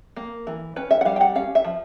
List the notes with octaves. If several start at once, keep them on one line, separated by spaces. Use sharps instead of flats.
A#3
E3
C#4 B4
E5
F#5
G3 F5
G5
F#5
C#4 F5
E5
F3